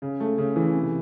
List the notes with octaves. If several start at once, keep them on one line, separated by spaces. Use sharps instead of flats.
C#3
A3
C#3
E3
C3